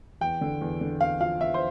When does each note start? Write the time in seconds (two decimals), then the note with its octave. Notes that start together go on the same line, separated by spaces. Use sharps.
0.21 E2 G5
0.41 D3
0.61 E2
0.81 D3
1.01 E2 F5
1.20 F3 F5
1.41 E2 E5
1.54 C5